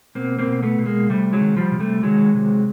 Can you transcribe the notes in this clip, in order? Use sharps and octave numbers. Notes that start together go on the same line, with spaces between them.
B2 A#3 C4
A#3 C4
B2
A3 B3
B2
G#3 A#3
C3 G3 A3
F#3 G#3
D#3
F3 G3
C3
G3 A3
D#3 F#3 G#3
C3